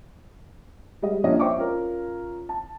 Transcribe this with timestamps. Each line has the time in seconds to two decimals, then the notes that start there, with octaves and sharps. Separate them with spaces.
1.02 G3 G#3 D#5
1.24 F3 A#3 C#4 D4 D5 D#5
1.39 C5 D#5 E5 G5 C#6 D6
1.56 C#4 F4 A#4
2.49 A5